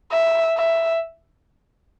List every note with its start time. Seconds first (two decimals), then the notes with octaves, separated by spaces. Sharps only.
0.11 E5
0.57 E5